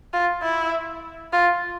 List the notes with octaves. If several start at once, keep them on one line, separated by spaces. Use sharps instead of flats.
F4
E4
F4